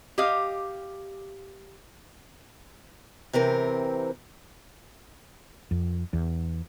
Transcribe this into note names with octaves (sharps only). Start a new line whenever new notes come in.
G4 D#5 F5
C3 E3 C4 A#4
F2
E2